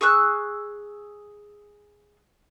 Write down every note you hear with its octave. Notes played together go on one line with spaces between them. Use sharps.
G#4 C#6 E6 F#6